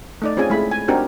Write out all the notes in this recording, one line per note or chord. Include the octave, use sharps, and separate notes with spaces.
A3 D#4 D5
C4 C#4 F4 G#4 G#5
G#3 A3 E4 B5
G#5
C4 D4 D#4 F#4 G4 A#4